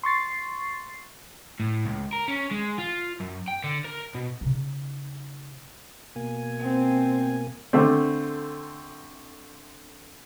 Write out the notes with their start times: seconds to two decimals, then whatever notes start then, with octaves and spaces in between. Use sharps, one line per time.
0.03 C6 C#6 A6 C7
1.60 A2
1.85 C#2
2.13 A#4
2.28 C#4
2.52 G#3
2.79 F4
3.21 F#2
3.48 G5
3.64 D3
3.84 A#4
4.14 B2
4.41 C#3 D#4
6.16 B2 A#3 G#5
6.60 C4
7.73 D3 A3 C4